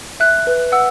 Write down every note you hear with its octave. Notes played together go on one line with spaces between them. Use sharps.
E5 F#6
B4
F#5 E6